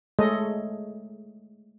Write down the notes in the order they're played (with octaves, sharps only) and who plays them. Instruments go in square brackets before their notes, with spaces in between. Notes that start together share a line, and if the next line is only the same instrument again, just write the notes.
[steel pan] G#3 A3 G#4 A4 C#5 D#5